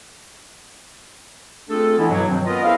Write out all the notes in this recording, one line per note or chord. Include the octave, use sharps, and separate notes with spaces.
A3 C4 D4 F4 G#4 A4
E3 G#3 B3 D4 E4
G2 B2 F#3
D#3 F3 F#3 C4
B3 C#4 F4 A#4 B4 D#5
E4 G#4 C5 E5 F5